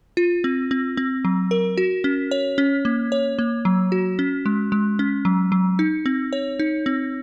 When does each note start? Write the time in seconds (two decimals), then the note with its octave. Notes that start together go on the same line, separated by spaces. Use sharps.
0.17 F4
0.44 C4
0.71 C4
0.97 C4
1.25 F#3
1.51 A#4
1.78 F#4
2.04 C#4
2.31 C#5
2.58 C#4
2.85 A#3
3.12 C#5
3.39 A#3
3.65 F#3
3.92 F#4
4.19 C#4
4.46 G#3
4.72 G#3
4.99 C#4
5.25 F#3
5.52 F#3
5.79 D#4
6.06 C4
6.33 C#5
6.59 D#4
6.86 C4